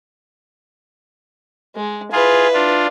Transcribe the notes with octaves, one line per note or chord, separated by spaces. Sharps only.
G#3
E4 F4 G#4 B4
D4 F4